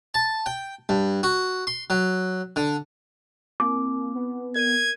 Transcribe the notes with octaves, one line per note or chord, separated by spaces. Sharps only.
A5
G5
G2
F#4
C6
F#3
D3
A#3 C4 D6
B3
A#4 G#6 D#7